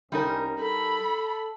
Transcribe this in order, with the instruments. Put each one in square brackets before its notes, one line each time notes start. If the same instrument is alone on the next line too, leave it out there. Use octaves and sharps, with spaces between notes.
[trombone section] C2 C#4 [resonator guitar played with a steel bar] G3 D#4 A#4
[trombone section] A4 [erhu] B5